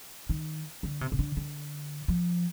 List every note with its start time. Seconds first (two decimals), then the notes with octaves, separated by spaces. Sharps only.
0.29 D#3
0.83 D3
1.01 C3
1.12 C3
1.19 D3
1.37 D3
2.08 F3